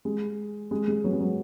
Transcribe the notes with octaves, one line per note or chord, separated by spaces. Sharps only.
G#3
G#3
G#3
F#3 B3
G#3
F#3